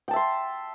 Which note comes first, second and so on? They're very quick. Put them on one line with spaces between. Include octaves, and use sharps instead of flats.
G5 A5 E5 C6